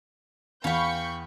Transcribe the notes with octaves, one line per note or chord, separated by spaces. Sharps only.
E2 F5 G5 B5 C#6 G6